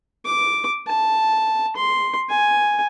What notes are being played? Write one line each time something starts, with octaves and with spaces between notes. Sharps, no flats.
D6
A5
C6
G#5